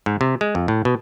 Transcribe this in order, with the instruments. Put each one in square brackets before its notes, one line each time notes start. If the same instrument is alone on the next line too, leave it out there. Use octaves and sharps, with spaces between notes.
[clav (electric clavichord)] G#2
C3
G#3
F2
A2
B2